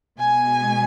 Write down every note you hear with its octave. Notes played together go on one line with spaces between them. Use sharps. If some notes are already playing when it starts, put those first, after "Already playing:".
B2 G#3 G#5